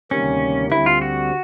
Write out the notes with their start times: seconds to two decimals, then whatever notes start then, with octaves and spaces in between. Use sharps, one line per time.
0.11 D2 C3 D#3 G3 A#3 C#4
0.71 D2 D3 G3 C4 E4
0.86 F4
1.02 F#4